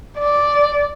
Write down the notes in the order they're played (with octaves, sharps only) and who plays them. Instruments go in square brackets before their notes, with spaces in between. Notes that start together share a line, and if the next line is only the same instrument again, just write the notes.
[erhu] D5